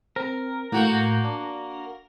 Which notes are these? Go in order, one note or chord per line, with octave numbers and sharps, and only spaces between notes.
C4 A#4
A2 A#3 F#4 F#5 G6
D4